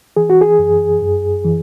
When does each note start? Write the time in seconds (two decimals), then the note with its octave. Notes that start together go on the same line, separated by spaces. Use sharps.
0.17 E3 G#4
0.30 F#4
0.41 G#4
0.59 F#2
1.02 F#2
1.45 E3